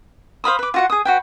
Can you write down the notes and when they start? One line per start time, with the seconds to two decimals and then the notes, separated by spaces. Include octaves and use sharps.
0.44 C5 F5 B5 D#6
0.59 B4 D6
0.74 F4 F#4 F#5
0.90 G#4 D#6
1.05 F#4 B4 G5